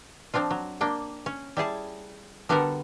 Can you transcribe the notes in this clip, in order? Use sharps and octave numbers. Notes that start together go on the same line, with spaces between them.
F3 C4 D4 F4
F#3
A#3 D4 G5
C#4
G3 E4 G#4 A5
D3 G3 B3 F#4 A4 A#4